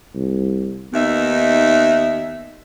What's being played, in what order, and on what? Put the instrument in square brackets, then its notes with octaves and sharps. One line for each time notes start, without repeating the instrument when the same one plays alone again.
[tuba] C2
[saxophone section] D#2 D#4 E5 [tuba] B3